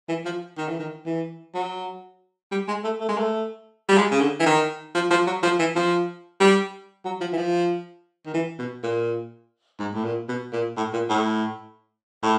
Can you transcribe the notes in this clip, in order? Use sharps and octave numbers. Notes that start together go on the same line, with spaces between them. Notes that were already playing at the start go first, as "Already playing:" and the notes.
E3
F3
D#3
E3
D#3
E3
F#3
G3
G#3
A3
A3
G#3
A3
G3
G#3
C#3
D3
E3
D#3
F3
F3
F#3
F3
E3
F3
G3
F#3
F3
E3
F3
D#3
E3
B2
A#2
G#2
A2
A#2
B2
A#2
A2
A#2
A2
A2